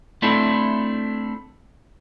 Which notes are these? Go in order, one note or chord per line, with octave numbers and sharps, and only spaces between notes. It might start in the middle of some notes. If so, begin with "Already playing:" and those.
A3 C4 D4 E4 A4